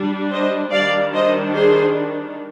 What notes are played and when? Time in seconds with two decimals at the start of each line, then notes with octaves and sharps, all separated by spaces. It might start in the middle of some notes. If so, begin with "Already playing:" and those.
Already playing: G3 D4
0.31 C5 D#5
0.72 D#3 G3 D4 D5 F5
1.14 C5 D#5
1.55 G#4 C5